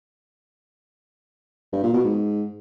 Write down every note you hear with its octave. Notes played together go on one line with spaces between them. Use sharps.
G2
A#2
B2
G#2